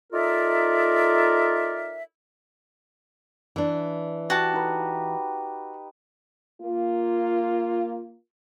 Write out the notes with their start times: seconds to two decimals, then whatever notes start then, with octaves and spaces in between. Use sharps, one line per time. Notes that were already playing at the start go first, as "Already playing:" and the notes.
0.13 D#4 F4 A4 A#4 D5 E5
3.56 E3 D4
4.30 F#4 G4 A5
4.53 D#4 B4
6.61 A#3 F4